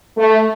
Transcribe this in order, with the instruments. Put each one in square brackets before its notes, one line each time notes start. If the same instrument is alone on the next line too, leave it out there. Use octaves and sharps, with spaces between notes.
[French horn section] A3